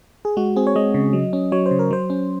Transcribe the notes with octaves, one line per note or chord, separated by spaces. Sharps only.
G#4
G#3 F#4
C4 G#4
C#5
G#3 D#5
C#3
F#3
C#4
F#3 C#5
C5
C#3
A#4
F#3 C5
C#4